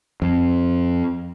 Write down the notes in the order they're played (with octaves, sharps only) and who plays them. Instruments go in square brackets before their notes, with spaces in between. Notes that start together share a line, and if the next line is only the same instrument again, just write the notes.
[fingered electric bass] F2